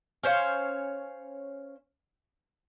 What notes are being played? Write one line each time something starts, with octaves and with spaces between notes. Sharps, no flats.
C#4 C5 C#5 F5